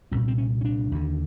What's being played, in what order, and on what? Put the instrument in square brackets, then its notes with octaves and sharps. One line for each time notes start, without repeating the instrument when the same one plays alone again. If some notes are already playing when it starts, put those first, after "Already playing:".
[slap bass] C2 A#2 C#4
C4
C#4
C#4
D4
D#2 D3